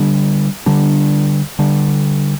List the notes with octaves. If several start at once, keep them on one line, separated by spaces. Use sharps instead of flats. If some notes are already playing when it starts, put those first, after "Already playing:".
Already playing: D3 G3 D4
D3 G3 D4
D3 G3 D4